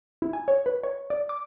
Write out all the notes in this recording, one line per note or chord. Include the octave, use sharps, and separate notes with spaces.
E4
G#5
C#5
B4
C#5
D5
D6